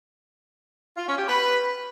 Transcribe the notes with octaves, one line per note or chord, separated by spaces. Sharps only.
F4
C#4
G4
B4